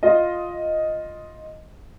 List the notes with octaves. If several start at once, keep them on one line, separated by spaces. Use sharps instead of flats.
F4 D#5